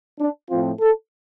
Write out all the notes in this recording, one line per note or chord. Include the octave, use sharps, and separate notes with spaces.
D4
A2 F3 C4 F4
A4